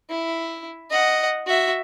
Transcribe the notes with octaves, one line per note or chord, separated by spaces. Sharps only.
E4
D#5 F#5
F#4 E5